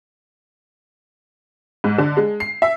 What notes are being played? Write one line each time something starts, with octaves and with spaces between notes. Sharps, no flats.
G#2
D3
G#3
C7
E5